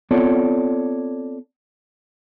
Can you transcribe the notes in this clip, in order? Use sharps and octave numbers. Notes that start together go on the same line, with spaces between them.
B3 C4 F4 A4 C#5 D5